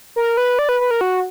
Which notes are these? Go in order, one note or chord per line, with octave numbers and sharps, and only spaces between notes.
A#4
B4
D5
B4
B4
A#4
F#4